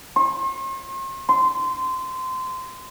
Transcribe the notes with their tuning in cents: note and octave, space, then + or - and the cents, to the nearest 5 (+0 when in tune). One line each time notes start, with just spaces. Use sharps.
C6 +45
C6 -20